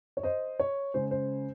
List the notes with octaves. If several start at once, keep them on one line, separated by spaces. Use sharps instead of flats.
C#5
C5 D#5
C#5
C#3 G#3 C#4 C5
C5